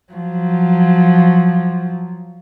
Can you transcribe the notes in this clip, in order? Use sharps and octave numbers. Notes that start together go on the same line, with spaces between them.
F3 F#3